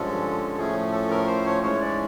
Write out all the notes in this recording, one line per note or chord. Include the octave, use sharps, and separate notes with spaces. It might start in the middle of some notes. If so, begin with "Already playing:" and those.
Already playing: G2 D3 F3 G#3 C#4 A4
A2 F3 A3 C#4 G#4
A4
A#4
C5
C#5
G#2 E3 G#3 C#4 C#5
D5